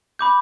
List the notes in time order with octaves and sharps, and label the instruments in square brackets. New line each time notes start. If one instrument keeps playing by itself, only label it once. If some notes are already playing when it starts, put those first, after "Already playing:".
[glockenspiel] B5 D6 G6